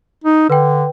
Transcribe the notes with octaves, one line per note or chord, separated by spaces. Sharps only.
D#4
D3 B4 G5